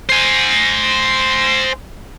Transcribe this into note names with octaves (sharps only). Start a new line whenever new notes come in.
C5 G#5